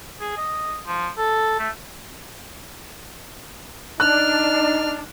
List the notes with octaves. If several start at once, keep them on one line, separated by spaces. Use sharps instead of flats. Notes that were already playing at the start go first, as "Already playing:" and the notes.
G#4
D#5
F3
A4
A3
D4 D#4 F6 F#6